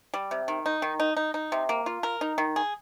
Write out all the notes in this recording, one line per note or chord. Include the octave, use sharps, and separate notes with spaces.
G3
C3
D#3
D#4
D#3
D#4
D#4
D#4
C3
A#3
F4
A#4
D#4
D#3
G#4